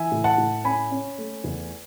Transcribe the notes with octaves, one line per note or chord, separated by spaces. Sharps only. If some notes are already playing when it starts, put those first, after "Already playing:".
Already playing: E3 E5 G#5
A2
F#5 A5
A2
C#4 G#5 B5
C#4
A3
E2